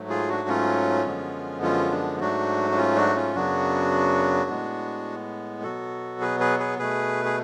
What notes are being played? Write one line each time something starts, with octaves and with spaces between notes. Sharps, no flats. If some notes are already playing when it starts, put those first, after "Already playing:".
Already playing: G#2 F#3 A3
F4 G#4
D4 F#4
C#4 F4
F#2 D3 F3 G#3 B3
C#4 F4
D4
G#2 F#3 A3 D4 F#4
D4
C#4 F4
D4 F#4
C#4 F4
F#2 C#3 F#3 B3 D4 F#4
A2 G#3 B3
B2 F#3 B3 F#4 A4
G#4 B4
G#4 B4
G#4 B4
B2 A3 G#4 B4
G#4